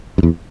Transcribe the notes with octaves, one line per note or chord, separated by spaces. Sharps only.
F#2
E2